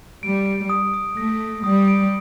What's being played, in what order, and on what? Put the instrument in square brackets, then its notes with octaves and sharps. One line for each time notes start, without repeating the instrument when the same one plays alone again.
[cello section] G3 [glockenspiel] D7
[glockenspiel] D7
D#6
D#6
[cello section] A3 [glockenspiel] A#6
[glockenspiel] D#6
[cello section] G3 [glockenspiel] D#6
[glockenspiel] D7